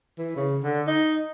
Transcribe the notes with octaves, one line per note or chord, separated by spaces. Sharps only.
E3
C#3
D3
D#4